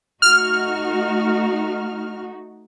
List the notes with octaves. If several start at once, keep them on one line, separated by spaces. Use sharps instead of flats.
A3 D#4 F#4 F6